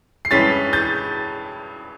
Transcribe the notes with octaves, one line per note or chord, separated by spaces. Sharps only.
C7
G2 E3 G#3 C#4 A6 B6
G6 A6